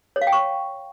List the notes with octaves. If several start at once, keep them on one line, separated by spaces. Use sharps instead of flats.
C#5
F5
G5
C#6